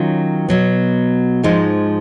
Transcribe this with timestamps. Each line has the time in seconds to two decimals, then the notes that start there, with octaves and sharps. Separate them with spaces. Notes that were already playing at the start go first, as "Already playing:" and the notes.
Already playing: D#3 F#3 C#4 F4
0.49 B2 F#3 B3
1.43 G#2 F3 G#3 D#4